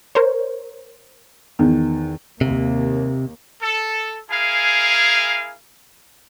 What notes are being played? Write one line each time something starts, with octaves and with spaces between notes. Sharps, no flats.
A#4 C5 C#5
E2 D#3
D#2 C3 A#3
A4
E4 G#4 A#4 F5 G#5